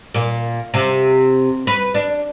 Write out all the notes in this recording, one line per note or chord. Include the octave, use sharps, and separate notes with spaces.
A#2
C3
B4
D4